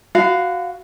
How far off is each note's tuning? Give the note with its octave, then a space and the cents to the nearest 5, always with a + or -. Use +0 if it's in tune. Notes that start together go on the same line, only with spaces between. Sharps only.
F#4 +0 F5 +0 B5 +45